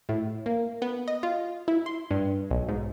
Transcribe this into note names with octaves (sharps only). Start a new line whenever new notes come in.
A2
A#3
B3
D#5
F4
E4
C6
G2
B1
G#2